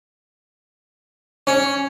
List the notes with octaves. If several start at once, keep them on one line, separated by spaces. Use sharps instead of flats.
C#4